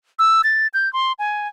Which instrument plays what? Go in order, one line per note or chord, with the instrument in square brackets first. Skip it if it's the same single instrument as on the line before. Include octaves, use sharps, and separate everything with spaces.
[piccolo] E6
A6
G6
C6
G#5